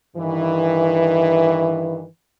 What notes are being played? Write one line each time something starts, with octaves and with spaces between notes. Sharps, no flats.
G2 D#3 E3